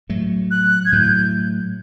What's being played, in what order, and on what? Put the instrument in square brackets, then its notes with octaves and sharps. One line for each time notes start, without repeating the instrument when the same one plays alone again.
[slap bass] A2 F#3 A3
[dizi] F#6
G#6
[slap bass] A2 F#3 A3 [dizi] G6